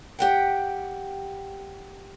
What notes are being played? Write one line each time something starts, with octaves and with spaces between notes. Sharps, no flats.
G4 F#5 G5